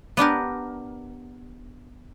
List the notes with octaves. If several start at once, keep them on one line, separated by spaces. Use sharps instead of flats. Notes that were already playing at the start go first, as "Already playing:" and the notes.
B3 D4 G4 A#4